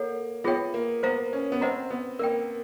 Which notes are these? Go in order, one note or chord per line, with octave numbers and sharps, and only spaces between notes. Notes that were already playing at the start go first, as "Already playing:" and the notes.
Already playing: A#3 A4 C#5 F#5
B3 F4 G#4 C#5 E5 G5
A#3
B3 C5 F5 A#5
C#4
B3
C4 C5 D#5 F#5 A#5
B3
A#3 A#4 D5 G5